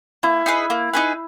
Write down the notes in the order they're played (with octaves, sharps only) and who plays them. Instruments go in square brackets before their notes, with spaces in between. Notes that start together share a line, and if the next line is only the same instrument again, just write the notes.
[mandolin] A#3 [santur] E4
[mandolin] D#4 G#4 B4
A#3
D#4 G#4 B4